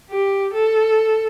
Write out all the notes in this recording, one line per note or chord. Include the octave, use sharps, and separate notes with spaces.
G4
A4